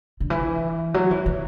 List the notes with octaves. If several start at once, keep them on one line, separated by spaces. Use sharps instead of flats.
D3
E3
F#3
E3
E3